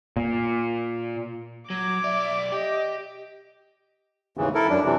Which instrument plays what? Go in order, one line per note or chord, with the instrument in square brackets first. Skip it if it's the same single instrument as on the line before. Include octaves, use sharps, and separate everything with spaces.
[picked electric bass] A#2
[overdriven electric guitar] F#3 [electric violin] D6 [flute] G#6
[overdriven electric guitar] B1 D5 [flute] E5
[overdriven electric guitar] G4 [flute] D#5
[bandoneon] D#2 G#2 C#3 E3
E4 A4 A#4
F#2 D4
C3 E3